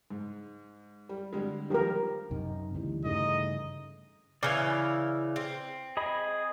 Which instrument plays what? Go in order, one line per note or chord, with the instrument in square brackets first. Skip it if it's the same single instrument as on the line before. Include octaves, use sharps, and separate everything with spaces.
[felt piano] G#2
G3
D3 G3 G#3
[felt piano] D#3 F3 G3 [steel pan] G4 A#4
[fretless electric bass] F#2 C3 [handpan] D#4
[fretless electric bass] D2 [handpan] C#3 E3 G3
[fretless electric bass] G2 C#3 E3 [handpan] A3 D#4 G#4 [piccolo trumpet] D#5
[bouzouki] C#3 E3 E4 [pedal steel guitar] D5 F5
[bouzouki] C4
[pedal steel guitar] G#4 D#5 B5